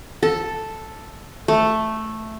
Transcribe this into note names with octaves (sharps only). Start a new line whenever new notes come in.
A4
A3